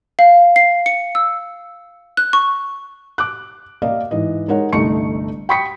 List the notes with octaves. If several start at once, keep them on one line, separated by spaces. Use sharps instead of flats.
F5
C7
C#7
E6
F#6
C#6
D6 F#6
A#3 A#4 D5 D#5 F5
G#2 E3 D#5
G#3 D#4 A#4 C#5 F#5
G1 C2 A3 D#4 C#6 C#7
G5 B5 C#6 D#6 B6 C#7